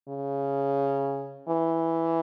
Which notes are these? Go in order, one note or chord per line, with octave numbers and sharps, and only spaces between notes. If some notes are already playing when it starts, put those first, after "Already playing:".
C#3
E3